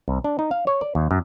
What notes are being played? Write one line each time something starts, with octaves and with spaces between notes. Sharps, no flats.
C2
D4
D#4
F5
C#5
D5
D#2
F#2